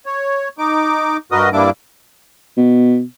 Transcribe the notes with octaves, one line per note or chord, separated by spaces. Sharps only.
C#5
D#4 D6
G2 F#4 A#4 B4 D#5 D#6
G2 G3 A#3 D4 E4 D6
B2